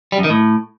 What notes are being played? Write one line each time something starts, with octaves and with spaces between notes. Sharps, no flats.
G3
F#2
D#3
A2